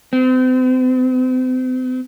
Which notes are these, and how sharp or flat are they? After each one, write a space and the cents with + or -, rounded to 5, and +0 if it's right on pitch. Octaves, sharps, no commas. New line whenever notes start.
C4 -40